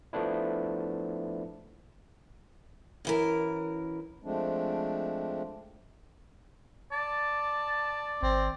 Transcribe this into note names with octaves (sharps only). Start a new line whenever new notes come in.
F3 A3 B3 D4 E4
F#2 E3 A#4
F3 G#3 A3 C4 D4
D5 A5
G#1 C4